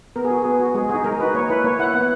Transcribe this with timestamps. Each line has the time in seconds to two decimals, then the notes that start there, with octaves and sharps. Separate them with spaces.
0.16 B3 A#4
0.25 G#4
0.31 F#4
0.42 B3 G#4
0.60 F#4
0.74 G#3 G#4
0.89 D#4 F#4 G#4
1.04 G#3 A#4
1.20 D#4 F#4 B4
1.35 A#3 C#5
1.49 E4 B4
1.64 A#3 C#5
1.79 E4 F#5
1.94 B3 F#5